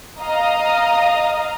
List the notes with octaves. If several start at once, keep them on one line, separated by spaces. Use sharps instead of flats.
D#5 F5 A#5 D#6